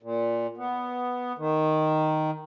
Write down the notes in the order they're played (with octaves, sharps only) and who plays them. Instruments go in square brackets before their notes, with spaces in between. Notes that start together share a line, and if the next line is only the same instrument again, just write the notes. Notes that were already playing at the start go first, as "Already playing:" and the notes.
[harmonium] A#2
B3
D#3